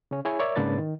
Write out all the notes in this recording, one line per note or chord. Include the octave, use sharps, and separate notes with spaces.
C#3 C#4
E4 G#4 C#5 G#5 C#6
A#4 C#5 D5 E5
G#2 C#3 A#3 D4 B4 A6
D#3